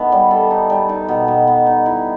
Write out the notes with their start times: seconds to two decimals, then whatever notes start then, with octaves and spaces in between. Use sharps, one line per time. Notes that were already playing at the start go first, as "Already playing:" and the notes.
Already playing: D#3 A3 B3
0.12 G3
0.31 A4
0.51 D#4
0.70 G3
0.89 D#4
1.08 B2
1.28 B2
1.48 B3
1.67 D#4
1.86 E4